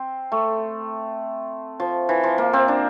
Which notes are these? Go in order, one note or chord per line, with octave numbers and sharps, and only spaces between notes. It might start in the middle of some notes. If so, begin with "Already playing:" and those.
Already playing: C4
A3
F3
E3
F3
A#3
C4
D4